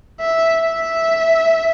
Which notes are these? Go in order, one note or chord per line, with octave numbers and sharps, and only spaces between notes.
E5
E5